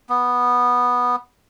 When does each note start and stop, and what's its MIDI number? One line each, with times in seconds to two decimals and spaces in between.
0.09 1.16 59